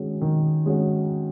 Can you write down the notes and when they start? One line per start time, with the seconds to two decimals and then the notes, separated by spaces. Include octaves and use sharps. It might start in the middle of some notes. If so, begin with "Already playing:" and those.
Already playing: D#3 G#3 C#4 F#4
0.21 D#3
0.65 G#3 C#4 F#4